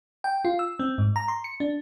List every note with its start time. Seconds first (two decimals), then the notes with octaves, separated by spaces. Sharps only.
0.24 G5
0.45 F4
0.59 E6
0.79 C4
0.98 G#2
1.16 A#5
1.28 C6
1.44 C#7
1.60 D4